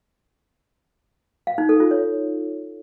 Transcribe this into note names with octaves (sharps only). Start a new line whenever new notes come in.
F5
D#4
A4
F4
C#5